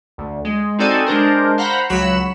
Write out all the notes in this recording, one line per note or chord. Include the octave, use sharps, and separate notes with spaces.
D2
G#3
C4 D#4 F#4 A4 D5 G#5
G#3 D4 A#4 C5
C5 F5 F#5 A#5 B5
C#2 F#3 F#4 B5 C#7 E7